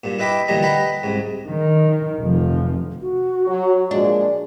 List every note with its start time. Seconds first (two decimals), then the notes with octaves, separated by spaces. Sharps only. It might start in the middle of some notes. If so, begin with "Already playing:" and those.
0.04 G2 A#2
0.19 E4 B4 D#5 G5 B5 D6
0.48 D2 A#2 E3 G3 D#5 A#5
0.62 B4 D#5 F#5 G5 A#5 B5
1.03 C2 G#2
1.49 D#3
2.20 F1 F3
3.01 F#4
3.47 F#3
3.91 A#2 F3 G#3 D4